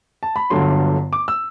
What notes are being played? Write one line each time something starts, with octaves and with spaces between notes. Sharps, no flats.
A5
B5
G1 G2 D3 F#3 C6
D6
E6